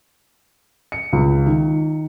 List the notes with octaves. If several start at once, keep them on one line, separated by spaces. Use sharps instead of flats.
C#7
C#2
D#3